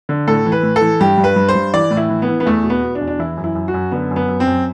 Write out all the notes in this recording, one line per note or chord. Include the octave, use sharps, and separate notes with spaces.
D3
A2 A4
E3
B4
A2
A4
E3
G2 G4
G2
B4
G2
C5
G2
E3 D5
A2
E4
E3
B3
E3
B3
E2 A3
B2
B3
B2
D4
E2
D4
E3 E4
F#2
E4
F#2
F#4
F#2
D3 B3
F#2
B3
F#2
C4
F#2